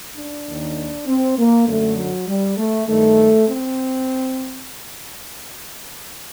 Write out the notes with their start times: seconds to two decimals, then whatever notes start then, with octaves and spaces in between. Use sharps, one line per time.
0.17 D4
0.47 D#2 D#3
1.07 C4
1.37 A#3
1.67 F#2 D3 A3
1.96 F#3
2.27 G3
2.57 A3
2.87 G2 D#3 A3
3.48 C4